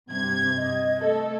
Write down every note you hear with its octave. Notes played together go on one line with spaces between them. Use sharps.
G2 C3 G#6
D#5
A3 A4